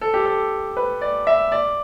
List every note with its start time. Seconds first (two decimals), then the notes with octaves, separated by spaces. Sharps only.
0.01 A4
0.14 G4
0.26 A4
0.77 B4
1.01 D5
1.27 E5
1.52 D5